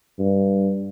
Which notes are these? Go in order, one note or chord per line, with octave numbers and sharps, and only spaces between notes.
G2